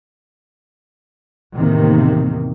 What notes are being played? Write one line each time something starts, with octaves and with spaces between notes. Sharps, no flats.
E2 A2 C3 D#3 A#3